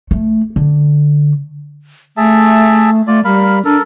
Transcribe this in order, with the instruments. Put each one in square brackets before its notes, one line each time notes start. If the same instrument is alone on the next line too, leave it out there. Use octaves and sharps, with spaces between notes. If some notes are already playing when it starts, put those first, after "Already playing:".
[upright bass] A3
D3
[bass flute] A3 [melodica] G#4 E5 A5
[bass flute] A3 [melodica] F4 D5
[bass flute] G3 [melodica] A#4 F5 B5
[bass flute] D4 [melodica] A4 A#4